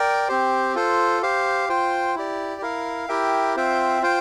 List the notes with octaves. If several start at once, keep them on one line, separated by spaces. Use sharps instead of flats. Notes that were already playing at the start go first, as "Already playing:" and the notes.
Already playing: A#4 D5 G5
C4 G4 C5
F4 A4 C5
G4 C5 F5
F4 C5 G5
E4 G4 D5
E4 A#4 F5
E4 G4 A#4 E5 G5
C4 F4 C5 E5 G5
F4 C5 G5